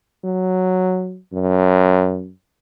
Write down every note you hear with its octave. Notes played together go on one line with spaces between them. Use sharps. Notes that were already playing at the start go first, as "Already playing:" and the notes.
F#3
F#2